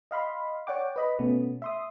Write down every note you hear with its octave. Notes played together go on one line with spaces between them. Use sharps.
D#5 F5 B5 C6
C#5 D5 F#5 G5 D6
B4 D#5 B5
B2 A3 B3 C#4
E5 C6 D#6